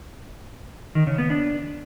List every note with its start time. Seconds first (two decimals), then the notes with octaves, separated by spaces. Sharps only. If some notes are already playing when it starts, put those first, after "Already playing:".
0.95 D#3
1.07 C#3
1.18 B3
1.30 D4